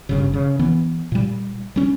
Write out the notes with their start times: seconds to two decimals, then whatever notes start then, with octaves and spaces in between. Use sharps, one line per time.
0.09 G1 G2 C#3
0.34 C#3
0.59 E3 B3
1.12 A#2 G3
1.76 G3 C#4